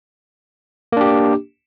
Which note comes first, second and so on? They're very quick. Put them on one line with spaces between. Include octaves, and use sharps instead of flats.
A#3 D4 G4